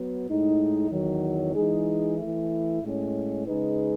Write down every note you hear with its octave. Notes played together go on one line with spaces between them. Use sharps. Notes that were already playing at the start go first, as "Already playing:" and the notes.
Already playing: F#3 B3
A2 G#3 D#4
E2 D#3 F#3
E3 G#3 D#4 G#4
E3 A3 E4
A2 G#3 C#4
C#3 G#3 D#4 G#4 B4